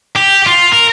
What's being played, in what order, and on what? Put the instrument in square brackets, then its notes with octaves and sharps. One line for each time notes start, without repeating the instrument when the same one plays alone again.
[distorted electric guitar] G4
F4
A#4